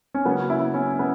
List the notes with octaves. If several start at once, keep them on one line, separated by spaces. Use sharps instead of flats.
C#4
C#3 F#3 A#3 B3
E4
C#4
B3